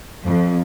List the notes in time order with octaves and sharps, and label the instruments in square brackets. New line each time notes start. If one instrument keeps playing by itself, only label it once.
[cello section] F2